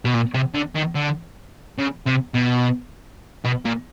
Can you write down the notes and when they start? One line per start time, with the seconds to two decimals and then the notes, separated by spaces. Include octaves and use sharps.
0.05 B2
0.14 A#2
0.34 C3
0.55 D3
0.76 D#3
0.96 D3
1.79 C#3
2.06 C3
2.34 B2
3.44 B2
3.65 A#2